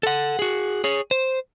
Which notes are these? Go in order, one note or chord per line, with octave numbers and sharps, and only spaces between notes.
A4 F#5
F#4 G#4
G#4 C#5
C5